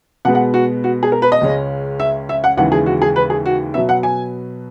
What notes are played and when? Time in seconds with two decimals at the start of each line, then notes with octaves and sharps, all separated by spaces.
0.25 B2 G#3 B3 F#5
0.35 F#5
0.54 F#4
0.84 F#4
1.03 G#4
1.12 A#4
1.22 B4
1.32 D#5
1.41 C#2 C#3 G#3 C#4
2.00 E5
2.29 E5
2.44 F#5
2.57 D#2 C#3 E3 G#3 F#5
2.72 G#4
2.86 F#4
3.02 G#4
3.16 B4
3.30 G#4
3.46 F#4
3.74 B2 F#3 B3 E5
3.89 F#5
4.03 G#5